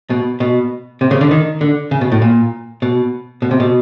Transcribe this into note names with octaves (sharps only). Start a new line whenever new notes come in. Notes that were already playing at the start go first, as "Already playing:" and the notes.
B2
B2
C3
C#3
D3
D#3
D3
C#3
B2
A2
A#2
B2
B2
C3
B2